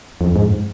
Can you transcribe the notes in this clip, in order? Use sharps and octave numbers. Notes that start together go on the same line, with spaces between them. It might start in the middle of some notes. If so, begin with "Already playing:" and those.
F2
G#2